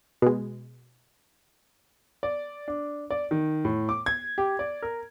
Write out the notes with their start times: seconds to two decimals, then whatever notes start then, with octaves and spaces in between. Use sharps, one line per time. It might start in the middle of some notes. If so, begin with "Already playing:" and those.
0.22 B2 G#3
2.23 D5
2.68 D4
3.11 D5
3.31 D#3
3.65 A2
3.89 D6
4.06 G#6
4.38 G4
4.59 D5
4.82 A#4